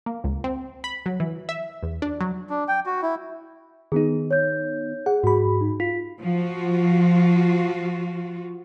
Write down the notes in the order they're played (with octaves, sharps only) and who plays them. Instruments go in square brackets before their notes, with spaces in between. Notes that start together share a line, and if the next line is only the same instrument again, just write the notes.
[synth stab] A#3
C#2
C4
B5
F#3
E3
E5
E2
D4
F#3
[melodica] D4
G5
F#4
E4
[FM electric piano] D#3 B3 D#4 [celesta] G#4
[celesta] C#5 G6
[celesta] G#4 [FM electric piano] F#5
[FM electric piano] G#2 B5 [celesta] F#4 G#4
[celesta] D#4
[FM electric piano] F4 [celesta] B6
[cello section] F3 F4 F#4